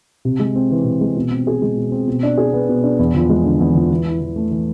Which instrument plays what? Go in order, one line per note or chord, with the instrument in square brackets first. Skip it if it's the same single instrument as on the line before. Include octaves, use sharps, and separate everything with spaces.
[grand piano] C3
G#3
C4
E3
C3
G#3
B2
C4
G#4
G#3
B2
C4
B2
D4
G#4
B3
B2
D4
E2
F3
G#3
D3
E2
F3
E3
E4
E3
A3
E3